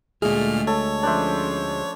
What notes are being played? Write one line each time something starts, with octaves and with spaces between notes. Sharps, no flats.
D2 A#2 G#3 A3 G#4 F6
A4 C#5
F3 C#4 D4 C5 E5